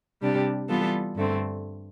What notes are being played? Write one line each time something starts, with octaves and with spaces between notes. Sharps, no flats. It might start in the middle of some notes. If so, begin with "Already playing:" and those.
C3 G3 D4 G4
E3 G3 B3 F4 A4
G2 D3 A3 C4